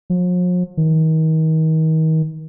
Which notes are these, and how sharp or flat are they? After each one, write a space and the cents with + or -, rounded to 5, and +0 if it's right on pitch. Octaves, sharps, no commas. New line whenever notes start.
F3 +45
D#3 +35